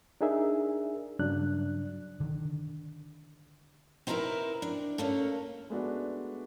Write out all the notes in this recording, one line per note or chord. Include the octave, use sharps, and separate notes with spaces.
D4 D#4 G#4 A#4 E5
G2 C#3 F#3 D4 F#6
D3 D#3
C4 D#4 E4 G#4 A#4 B4
D4
A3 A#3 C#4
G#3 A3 B3 D4 F#4